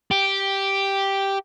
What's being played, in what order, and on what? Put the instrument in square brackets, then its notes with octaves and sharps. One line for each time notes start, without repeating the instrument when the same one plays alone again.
[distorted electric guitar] G4